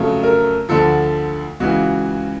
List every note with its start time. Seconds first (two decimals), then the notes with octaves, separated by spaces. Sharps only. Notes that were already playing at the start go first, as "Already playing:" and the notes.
Already playing: F2 C#3 F#3 A3
0.23 A#4
0.69 D2 D3 F3 A4
1.60 C#2 C#3 E3 F#4